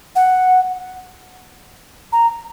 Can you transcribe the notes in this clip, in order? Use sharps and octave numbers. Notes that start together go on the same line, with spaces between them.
F#5
A#5